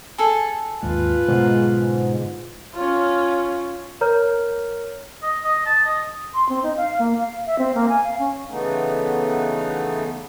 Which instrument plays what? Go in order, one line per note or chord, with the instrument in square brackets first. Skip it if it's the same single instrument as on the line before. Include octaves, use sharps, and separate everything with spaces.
[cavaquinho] G#4 A4
[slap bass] D#2 G#2 G#3 [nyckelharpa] F4 B4
[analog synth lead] G#2 [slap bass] B2 D3 F#3
[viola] C#4 F4
[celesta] A#4 C#5 A#5 F6 G6
[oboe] D#5
D#5
A5
D#5
[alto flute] C6
C4
D#4
F5
A#3
F5
E5
C4
A#3
G#5
F5
C#4
[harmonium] C#3 E3 A3 B3 D#4